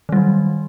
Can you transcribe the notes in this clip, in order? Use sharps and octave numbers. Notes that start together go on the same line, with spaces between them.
D#3 F#3 G3